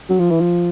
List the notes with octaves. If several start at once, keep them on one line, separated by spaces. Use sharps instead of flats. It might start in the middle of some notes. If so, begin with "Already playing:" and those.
F#3
F3
E3
F3